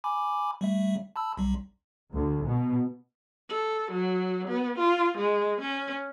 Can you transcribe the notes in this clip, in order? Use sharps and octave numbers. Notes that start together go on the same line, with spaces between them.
G#5 B5 D6
G3 A3 E5
A5 B5 E6
B1 G3
D2
B2
A4
F#3
B3
F4
G#3
C#4